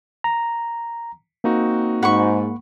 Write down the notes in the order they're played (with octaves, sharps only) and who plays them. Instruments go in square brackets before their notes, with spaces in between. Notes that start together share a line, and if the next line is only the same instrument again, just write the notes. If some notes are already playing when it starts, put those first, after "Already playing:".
[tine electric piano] A#5
[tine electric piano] A#3 [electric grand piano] C4 D#4 F#4
[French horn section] G#2 [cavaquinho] F#5 B5 C#6